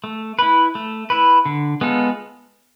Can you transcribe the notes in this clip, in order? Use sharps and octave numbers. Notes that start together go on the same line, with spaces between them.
A3
E4 B4
A3
E4 B4
D3
G#3 B3 F4 A4